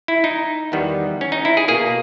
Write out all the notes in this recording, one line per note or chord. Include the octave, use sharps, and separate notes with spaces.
E4
D#4
E2 D#3 G3 B3
C#4
D#4
E4
G#4
B2 A#3 G#4